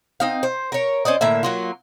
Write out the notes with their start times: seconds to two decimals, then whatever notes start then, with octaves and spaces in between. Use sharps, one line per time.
0.20 C4 D#4 F5
0.43 C5
0.72 A#4 C#5
1.05 C#4 C5 D5 D#5
1.21 A2 D3 A#3 E5
1.43 F#3 A#3 F4